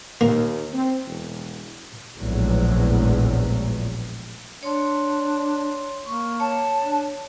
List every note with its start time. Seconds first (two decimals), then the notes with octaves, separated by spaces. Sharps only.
0.21 D#2 A#3
0.73 C4
1.06 E1
2.15 F1 A#1 E2 A2 F#3 G#3
4.63 D4 C#5 C6
6.06 A#3 C#6
6.40 C#5 A5
6.82 D4